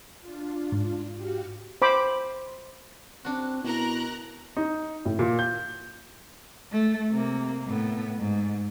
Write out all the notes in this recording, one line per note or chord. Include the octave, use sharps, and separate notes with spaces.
D4 F4
G#2
F#4 G4 F5
C5 B5 D6
C4 D4 F#4
B2 E4 A#4 A#5 F#6
D#4
A2
A#2
G6
A3
C3 A#3
A2 B3
G#2